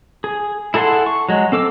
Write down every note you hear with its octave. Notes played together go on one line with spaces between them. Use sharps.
G#4
E4 G#4 A4 F#5 C6
C#6
F#3 G#3
C4 A4 D6 E6